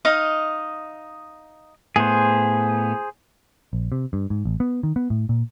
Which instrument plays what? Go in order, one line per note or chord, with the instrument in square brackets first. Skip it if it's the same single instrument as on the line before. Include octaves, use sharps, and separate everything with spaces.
[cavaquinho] D#4 D#5 F5
[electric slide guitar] A2 B3 [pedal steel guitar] G#4 C5
[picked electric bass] A#1
C3
G2
G#2
A1
B3
D#3
B3
A2
A#2